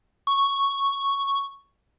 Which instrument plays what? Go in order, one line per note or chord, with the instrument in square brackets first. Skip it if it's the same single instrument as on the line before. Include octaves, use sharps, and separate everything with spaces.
[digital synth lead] C#6